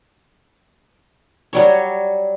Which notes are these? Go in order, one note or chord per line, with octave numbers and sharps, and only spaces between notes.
F#3 G3 C#5